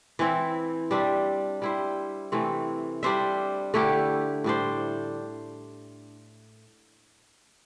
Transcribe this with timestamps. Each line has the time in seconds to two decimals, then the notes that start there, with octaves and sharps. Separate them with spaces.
0.19 E3 C4 E4
0.91 G3 D4 C5 E5
1.62 G3 E4 C5
2.32 C3 E3 A3 C4
3.03 G3 D4 C5 E5
3.74 D3 A3 E4 G4
4.44 A2 G3 D4 C5